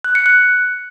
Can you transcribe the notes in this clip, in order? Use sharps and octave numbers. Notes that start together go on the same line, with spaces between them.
F#6
C#7
F#6